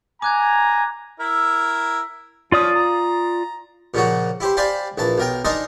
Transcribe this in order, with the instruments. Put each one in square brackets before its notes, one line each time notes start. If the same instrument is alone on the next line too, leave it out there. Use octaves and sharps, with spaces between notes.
[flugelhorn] G#5 [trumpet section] A#5 [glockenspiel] D6 F#6 G#6
[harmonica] E4 A#4 E6
[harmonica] F3 C#4 [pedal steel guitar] F4 D5 D#6
[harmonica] A#5
[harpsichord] A#2 C#3 F3 F#4
E4 G4 C5
G4 C5 D5 F5 G#5 B5
A#1 E3 A5
B1 A#4 G5
D4 D#4 G#4 A#4 C5 D#5